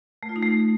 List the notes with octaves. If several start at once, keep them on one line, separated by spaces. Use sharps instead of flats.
A3
F4
D#4
A3